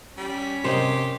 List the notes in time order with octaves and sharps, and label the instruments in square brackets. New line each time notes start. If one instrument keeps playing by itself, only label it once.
[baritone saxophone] G3 [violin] C#4 B6
[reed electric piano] C3 A#4 D#5 [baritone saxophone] G4 [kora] C5